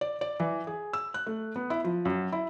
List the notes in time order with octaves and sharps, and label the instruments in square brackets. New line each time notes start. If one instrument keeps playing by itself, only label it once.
[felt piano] D5
D5
E3
G#4
E6
F#6
A3
B3
E4
F3
F#2
E4